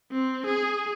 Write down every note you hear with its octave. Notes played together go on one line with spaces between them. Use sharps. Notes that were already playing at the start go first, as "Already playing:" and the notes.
C4
G#4